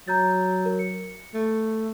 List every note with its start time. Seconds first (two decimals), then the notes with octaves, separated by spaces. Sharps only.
0.08 F#3 A#5 G6 A6
0.65 A#4
0.79 C#7
1.34 A3